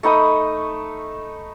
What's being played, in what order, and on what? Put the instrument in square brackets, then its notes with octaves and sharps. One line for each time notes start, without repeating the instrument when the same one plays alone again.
[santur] A3 D#4 B5 D#6